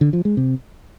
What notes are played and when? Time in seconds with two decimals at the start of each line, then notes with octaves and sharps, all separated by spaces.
0.01 D3
0.13 F3
0.25 G#3
0.37 C3